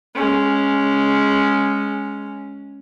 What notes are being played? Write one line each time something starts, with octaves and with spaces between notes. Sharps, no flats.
G#3 C#4